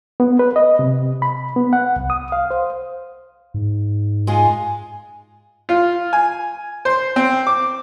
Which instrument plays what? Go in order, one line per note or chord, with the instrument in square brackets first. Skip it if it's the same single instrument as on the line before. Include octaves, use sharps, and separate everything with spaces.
[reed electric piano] B3
B4
D#5
C3
B5
B3
F#5
C2
D#6
F5
C5
[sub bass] G#2
[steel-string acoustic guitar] G#3 F4 G#4
[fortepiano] F4
G#5
C5
C4
D6